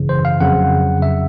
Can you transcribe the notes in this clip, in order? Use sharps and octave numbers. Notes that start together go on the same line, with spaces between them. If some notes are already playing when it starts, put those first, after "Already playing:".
Already playing: G#1 F#2 C#3 E3
C5
F5
F2 C#3 F#3 F#5
E5